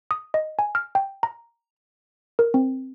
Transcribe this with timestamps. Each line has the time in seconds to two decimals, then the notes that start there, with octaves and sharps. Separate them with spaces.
0.11 D#6
0.34 D#5
0.59 G#5
0.75 F6
0.95 G5
1.23 A#5
2.39 A#4
2.54 C4